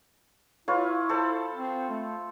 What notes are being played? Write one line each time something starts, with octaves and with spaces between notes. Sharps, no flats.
E4 F4 B4 C#5
A4 C5 B5
C4
A3